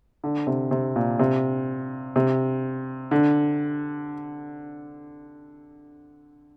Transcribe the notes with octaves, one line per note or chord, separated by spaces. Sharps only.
D3
C3
C3
A#2
C3
C3
D3